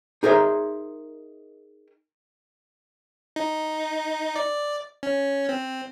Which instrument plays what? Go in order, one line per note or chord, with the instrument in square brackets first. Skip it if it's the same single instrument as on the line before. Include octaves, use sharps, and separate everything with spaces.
[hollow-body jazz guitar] D#4 G#4 A#4 C5 E5
[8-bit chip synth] D#4
D5
C#4
C4